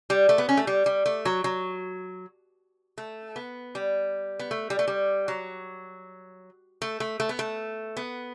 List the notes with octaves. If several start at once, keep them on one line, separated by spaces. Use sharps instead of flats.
G3
A3
B3
C#4
A3
G3
G3
A3
F#3
F#3
A3
B3
G3
B3
A3
G3
A3
G3
F#3
A3
A3
A3
B3
A3
B3